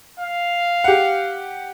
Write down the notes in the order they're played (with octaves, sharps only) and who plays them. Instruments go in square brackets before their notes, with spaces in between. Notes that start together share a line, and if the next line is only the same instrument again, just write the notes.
[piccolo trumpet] F5
[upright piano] G4 F#5